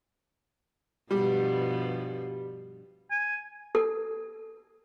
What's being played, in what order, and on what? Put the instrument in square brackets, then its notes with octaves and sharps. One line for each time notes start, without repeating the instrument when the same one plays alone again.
[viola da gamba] G2 B2 F3 [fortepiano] G3
[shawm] G#5
[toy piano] A4